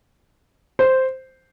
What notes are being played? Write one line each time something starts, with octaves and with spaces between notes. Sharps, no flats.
C5